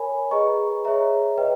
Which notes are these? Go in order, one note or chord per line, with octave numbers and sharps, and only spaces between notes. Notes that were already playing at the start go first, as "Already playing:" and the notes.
Already playing: A#4 C#5 G#5 B5
G#4 B4 D#5 A#5 C#6
G#4 C#5 E5 A#5
B4 D#5 G5